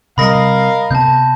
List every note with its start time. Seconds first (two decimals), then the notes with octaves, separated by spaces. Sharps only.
0.18 C3 G3 A#4 D#5 F5 B5 A#6
0.91 C3 B3 A5 G6